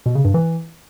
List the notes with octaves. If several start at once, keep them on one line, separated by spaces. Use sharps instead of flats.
B2
C#3
G2
E3